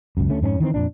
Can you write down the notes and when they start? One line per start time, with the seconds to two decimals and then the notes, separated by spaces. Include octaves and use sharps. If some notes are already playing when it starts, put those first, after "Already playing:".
0.17 C#2 F#2
0.29 D2 A3 C#4
0.41 F2 G#2 C4 C#4
0.60 D#3 E3 A#3 C4
0.74 F2 A#2 D4